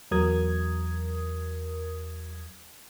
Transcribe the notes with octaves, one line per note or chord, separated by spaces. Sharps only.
E2 F#3 A#4 D#6 G#6